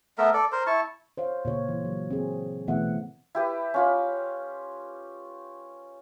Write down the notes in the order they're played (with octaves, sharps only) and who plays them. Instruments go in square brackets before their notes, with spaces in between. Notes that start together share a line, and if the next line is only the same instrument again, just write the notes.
[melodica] A3 B3 A#4 E5
A4 D5
A#4 C5
E4 A5 C#6
[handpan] C5 C#5 F5
A#2 C#3 C#5
E3
F#3
C4 G#4
B2 E3 A3 B3 E5 F#5
[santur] E4 G4 B4
C#4 F4 B5